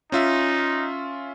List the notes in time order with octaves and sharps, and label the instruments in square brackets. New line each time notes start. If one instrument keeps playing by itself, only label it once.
[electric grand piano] C#4 F4 E5 [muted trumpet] D#4